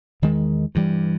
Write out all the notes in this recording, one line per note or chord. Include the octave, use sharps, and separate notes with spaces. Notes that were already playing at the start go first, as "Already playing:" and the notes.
E2 D#3 G#3
G2 E3 G3